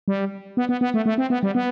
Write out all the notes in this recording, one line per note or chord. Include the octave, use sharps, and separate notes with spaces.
G3
B3
B3
B3
A3
A3
C4
B3
G3
B3